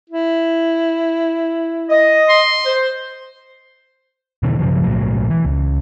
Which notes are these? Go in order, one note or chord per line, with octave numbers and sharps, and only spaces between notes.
E4
D#5
C6
C5
B2 D3 E3
G2 C#3 F3 F#3
B1 A2 F#3
E3
C#2